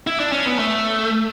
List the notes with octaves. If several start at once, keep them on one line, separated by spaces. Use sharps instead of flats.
E4
D4
C#4
B3
A3